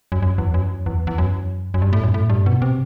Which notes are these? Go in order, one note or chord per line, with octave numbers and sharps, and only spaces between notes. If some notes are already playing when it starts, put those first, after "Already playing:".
F#2
F#2
E2
F#2
E2
E2
F#2
F#2
G2
A2
F#2
A2
G2
B2
C3